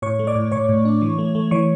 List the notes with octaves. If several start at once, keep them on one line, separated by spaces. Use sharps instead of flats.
A2 C#5 C#6
A3
D5 D6
A2
A2 C#5 C#6
A2
D4
E3
A3
A3
E3 C#5 C#6